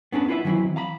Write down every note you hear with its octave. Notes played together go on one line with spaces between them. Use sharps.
B3 C#4 D4 A4 B4
E4 F4 B4 C#5 E5
D#3 E3 F#3 C4 E4
F5 A#5 B5